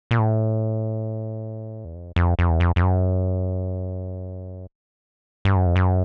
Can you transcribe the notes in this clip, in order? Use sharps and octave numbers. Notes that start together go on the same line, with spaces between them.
A#2
A2
E2
F2
F2
F2
E2
F2
F2
F#2
G2
F#2
F2
F#2